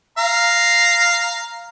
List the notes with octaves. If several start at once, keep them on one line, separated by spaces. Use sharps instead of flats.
F5 A#5